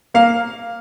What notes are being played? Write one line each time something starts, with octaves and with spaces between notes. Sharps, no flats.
A#3 F5